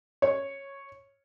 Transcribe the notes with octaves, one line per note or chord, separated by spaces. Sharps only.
C#5